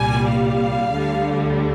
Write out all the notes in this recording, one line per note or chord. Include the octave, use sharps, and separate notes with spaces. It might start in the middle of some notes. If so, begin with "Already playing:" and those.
Already playing: C2 A#2 G3 G#5
F5
D2 D3 G3